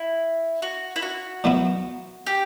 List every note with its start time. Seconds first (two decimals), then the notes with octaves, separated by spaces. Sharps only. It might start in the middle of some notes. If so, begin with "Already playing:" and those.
Already playing: E4
0.62 F#4
0.96 E4
1.02 F#4
1.44 A2 F#3 B3 E4
2.26 G4